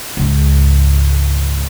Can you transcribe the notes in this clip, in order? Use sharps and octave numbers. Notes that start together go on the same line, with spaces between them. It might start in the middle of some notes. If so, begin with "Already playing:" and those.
C#2 G#2